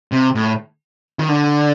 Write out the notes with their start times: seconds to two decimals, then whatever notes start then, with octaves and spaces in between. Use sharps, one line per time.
0.12 C3
0.35 A2
1.20 D#3
1.29 D3